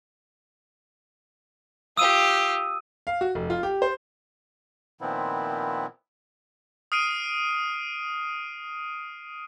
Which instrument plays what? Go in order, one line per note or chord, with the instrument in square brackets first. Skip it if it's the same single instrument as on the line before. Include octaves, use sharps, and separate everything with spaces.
[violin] F4 G4 [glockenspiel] D#6 E6 D#7
[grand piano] F5
F#4
F1
F4
G4
C5
[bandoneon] A#2 D#3 F3 B3 C4 E4
[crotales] D#6 F6 C7 D7 D#7